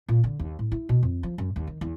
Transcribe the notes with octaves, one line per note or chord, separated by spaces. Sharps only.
A#2
D3
D#2
A2
E4
B2
F2
F3
F#2
D#2
D#3
E2